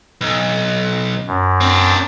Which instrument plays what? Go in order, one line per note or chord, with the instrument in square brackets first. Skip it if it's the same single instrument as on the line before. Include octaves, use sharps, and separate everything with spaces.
[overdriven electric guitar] B1
[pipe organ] F#2
[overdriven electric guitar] C4 D4